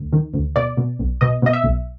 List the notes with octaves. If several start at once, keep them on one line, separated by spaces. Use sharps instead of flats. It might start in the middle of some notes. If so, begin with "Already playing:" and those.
Already playing: D2
D#3
D2
B2 D5
B2
B1
B2 D#5
B2 D#5
E5
B1